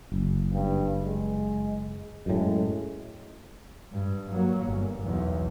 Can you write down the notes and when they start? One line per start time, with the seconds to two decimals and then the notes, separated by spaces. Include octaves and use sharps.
0.12 F#1
0.53 G2
1.00 G#3
2.26 F#2 A2 G#3
3.92 G2
4.32 F#3 A#3
4.66 G1
5.01 B1 E2